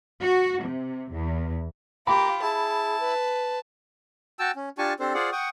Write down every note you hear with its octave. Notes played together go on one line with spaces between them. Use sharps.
F#4
C3
E2
A#3 F4 G4 A#5 B5 D6
E4 G#4 A5
B4
F#4 G5 A5 E6
C#4
D4 F4 G4 G#5 A5 C#6
C4 D4 G4 A4 C5
F4 G#4 C5 D5 F#5
F#5 G5 C#6 D#6